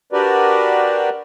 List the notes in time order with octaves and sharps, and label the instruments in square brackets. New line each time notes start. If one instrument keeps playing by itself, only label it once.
[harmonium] D4 F#4 G4 A#4 B4 D5